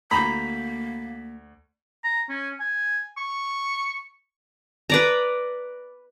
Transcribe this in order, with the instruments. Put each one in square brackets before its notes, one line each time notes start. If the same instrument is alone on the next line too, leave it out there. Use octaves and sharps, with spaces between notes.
[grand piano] D2 G6 [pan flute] A#3 [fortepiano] A#5 B5 [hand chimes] B6
[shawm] A#5
C#4
G#5
C#6
[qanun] B4 D5 A#5